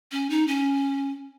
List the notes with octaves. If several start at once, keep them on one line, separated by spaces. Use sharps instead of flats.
C#4
D#4
C#4